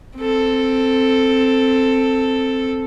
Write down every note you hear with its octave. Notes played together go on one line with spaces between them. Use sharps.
C4 A4